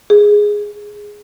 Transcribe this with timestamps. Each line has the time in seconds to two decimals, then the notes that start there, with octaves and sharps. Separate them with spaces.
0.10 G#4